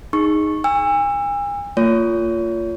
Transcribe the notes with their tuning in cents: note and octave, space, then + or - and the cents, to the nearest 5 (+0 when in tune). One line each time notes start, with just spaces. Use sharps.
D#4 +0 G#4 +0 C#6 -10
G#5 -40 E6 +15
A#3 -30 F4 -10 C#5 +30